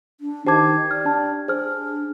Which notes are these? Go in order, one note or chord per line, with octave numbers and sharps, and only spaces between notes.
D4
D#3 G4 C5 A5 D6 G#6
D5 F6
D4 A5
D4 G#4 C5 F6